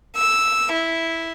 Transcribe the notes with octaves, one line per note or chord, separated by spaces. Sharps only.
E6
E4